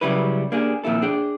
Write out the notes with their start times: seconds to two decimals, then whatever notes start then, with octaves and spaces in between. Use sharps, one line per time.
0.01 C#3 F#3 G3 E4 B4
0.52 A#3 D4 G4 G#4
0.84 F2 A#2 D#3 E4 A4
1.02 D4 G#4 G5